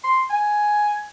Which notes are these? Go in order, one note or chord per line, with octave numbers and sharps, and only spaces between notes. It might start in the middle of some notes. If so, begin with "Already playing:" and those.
C6
G#5